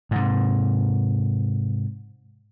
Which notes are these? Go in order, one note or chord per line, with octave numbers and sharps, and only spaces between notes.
G#2 C3